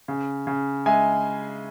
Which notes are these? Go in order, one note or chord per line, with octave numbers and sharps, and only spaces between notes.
C#3
C#3
G#3 E5 G#5